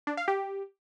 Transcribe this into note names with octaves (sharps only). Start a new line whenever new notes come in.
D4
F5
G4